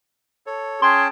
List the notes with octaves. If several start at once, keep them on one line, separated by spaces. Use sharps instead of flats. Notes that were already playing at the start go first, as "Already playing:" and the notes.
A4 C#5
C#4 G#4 G5 A5 C6